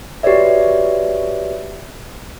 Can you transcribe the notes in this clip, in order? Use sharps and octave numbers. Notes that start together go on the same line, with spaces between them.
F#4 G4 B4 C#5 D5 E5